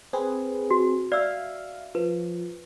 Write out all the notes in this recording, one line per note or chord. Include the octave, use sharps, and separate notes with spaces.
C4 G#4 B4
F#4
D5 E5 F5 E6
F3 B4